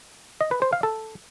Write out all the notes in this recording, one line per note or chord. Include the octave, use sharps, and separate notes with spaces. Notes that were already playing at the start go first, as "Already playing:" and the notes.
D#5
B4
C5
F5
A4